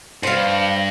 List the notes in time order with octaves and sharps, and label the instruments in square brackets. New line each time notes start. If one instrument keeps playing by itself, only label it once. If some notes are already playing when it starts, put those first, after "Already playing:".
[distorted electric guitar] G2 [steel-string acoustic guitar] C5 F5